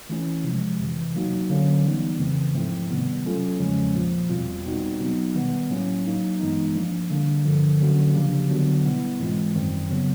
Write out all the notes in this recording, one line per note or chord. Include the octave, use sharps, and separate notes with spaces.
E3 A3 C#4 E4
C3 F3 G#3
F2 C3 E3
F#3 A#3 D#4 F#4
D3 F#3 A#3 C#4
E3 G3 B3 D#4
F2 C#3 E3 A3 C4
G#2 F3 A3 C4 E4
C3 D#3 G3 B3
F#3 A3 C#4 F4 A4
E2 C#3 F3 G#3 C#4
A#2 F3 A#3
E2 B2 G3 C4 F4
B2 G3 C4 D#4 F#4
B2 F#3 B3 D#4
D#3 G3 B3
A2 F#3 A#3 C#4 E4
F#3 A#3 D#4
G2 E3 G#3 B3 D#4
F3 A#3 D4
D3 G3 A#3 D4
G2 D3 F3
D3 F#3 A#3 C#4 F#4
C#3 F3 A#3 D4 G4
D3 F#3 B3 D4 F#4
B2 G3 B3 E4
G#2 E3 G#3 C4 F4
F#2 D#3 G3 C4
C#3 F#3 B3